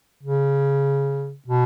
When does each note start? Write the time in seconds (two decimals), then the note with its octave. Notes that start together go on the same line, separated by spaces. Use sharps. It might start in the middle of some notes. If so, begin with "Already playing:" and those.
0.23 C#3
1.48 B2